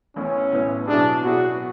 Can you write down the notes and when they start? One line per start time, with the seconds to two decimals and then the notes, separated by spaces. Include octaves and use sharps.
0.16 A1 A2 E3 B3 C#4
0.52 A1 A2 E3 B3
0.87 B2 F#3 B3 D4 E4 G#4
1.23 B2 F#3 B3 E4 F#4 G#4